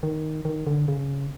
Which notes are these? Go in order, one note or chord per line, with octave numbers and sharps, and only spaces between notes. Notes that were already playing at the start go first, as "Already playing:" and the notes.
D#3
D#3
D3
C#3